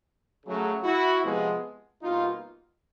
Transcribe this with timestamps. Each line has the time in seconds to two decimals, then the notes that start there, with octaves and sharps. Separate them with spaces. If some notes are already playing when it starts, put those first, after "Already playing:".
0.45 C#3 F#3 A3
0.84 E4 F#4
1.23 C3 F3 G#3 B3
2.02 B2 G3 A#3 D#4 F4